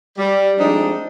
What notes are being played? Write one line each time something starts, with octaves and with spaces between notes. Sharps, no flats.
G3
F3 G#3 A3 C4 D4 D#4